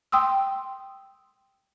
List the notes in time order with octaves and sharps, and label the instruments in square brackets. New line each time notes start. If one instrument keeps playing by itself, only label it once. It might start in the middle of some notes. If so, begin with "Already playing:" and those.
[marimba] G5 C6 D#6 E6